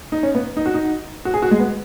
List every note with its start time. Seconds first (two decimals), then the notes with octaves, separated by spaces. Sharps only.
0.12 D#4
0.23 C#4
0.35 B3
0.57 D#4
0.66 F#4
0.74 D#4
1.25 F#4
1.34 G#4
1.42 F#4
1.51 G#3
1.59 B3